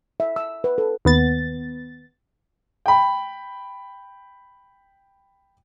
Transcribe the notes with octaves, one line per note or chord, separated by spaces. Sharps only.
E5
E6
B4
A4
D#2 B3 A6
G5 B5